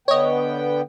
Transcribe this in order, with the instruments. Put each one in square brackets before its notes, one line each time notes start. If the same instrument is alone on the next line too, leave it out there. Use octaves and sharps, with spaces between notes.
[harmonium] D3 B3 G5 [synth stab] C#5 D#5